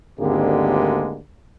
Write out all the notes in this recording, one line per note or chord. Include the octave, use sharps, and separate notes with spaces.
G#1 D2 D3 G#3 A#3 G4